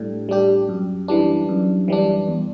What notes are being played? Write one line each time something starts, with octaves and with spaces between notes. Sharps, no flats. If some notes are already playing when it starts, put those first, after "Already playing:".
Already playing: A2 G3 D4 G4
G3 D4 G4
F#2
E3 G3 D4
F#2
E3 G3 D4
E2